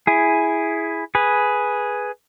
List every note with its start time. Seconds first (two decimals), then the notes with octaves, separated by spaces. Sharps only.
0.07 E4 G#4
1.15 G#4 B4